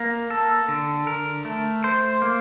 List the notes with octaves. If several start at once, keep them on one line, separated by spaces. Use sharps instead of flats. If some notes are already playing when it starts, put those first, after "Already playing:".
Already playing: A#3
A4
D3
A#4
A3
C5
A#3